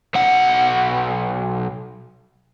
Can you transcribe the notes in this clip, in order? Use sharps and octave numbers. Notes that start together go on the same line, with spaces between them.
B1 F#5